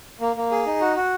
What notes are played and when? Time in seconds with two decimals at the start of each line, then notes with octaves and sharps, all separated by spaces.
0.21 A#3
0.36 A#3
0.51 G#4
0.66 D#4
0.81 F#4
0.96 F#4